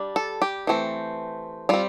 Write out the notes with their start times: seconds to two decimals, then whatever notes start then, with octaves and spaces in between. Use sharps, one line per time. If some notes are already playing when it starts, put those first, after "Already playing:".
Already playing: G3 D4
0.16 A4
0.42 G4
0.67 E3 A3 C4
1.69 G3 C4 F4